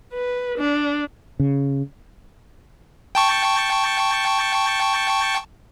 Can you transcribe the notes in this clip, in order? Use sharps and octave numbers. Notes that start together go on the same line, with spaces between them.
B4
D4
C#3
G5 A5 C#6